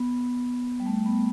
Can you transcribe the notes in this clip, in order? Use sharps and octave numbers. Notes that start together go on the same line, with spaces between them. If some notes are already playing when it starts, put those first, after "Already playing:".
Already playing: B3
G3
A3
B3